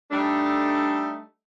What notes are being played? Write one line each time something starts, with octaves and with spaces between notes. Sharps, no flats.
G3 A3 D4 D#4 A4